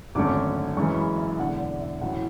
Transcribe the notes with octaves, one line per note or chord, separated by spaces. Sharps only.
G#1 F#2 D3 A3 C#4 D6
F#2 C#3 E3 G#3 C#4 C#6
B5
E5
E1 E2 D3 F#5
D5
E5
A1 A2 F#3 C#4 E4 F#5